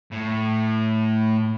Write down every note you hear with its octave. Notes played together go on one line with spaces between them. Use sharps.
A2